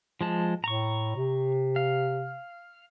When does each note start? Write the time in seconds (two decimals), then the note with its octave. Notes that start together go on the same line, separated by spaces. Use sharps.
0.21 F3 G#3 A5
0.64 A2 A#5 C#6
1.16 C3
1.76 F5